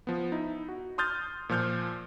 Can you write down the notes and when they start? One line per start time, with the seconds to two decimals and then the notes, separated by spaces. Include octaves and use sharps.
0.07 F3 B3
0.32 D#4 E4
0.68 F#4
0.98 C6 D#6 F6 G6 A6
1.49 A#2 F3 F6 G6